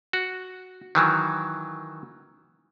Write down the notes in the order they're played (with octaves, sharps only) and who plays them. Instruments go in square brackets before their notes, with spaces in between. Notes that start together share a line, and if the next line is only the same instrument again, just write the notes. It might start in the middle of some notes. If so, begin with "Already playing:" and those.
[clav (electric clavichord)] F#4
D#3 E3 F#3